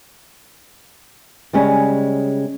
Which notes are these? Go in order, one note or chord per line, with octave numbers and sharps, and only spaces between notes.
C#3 G3 G#3 C#4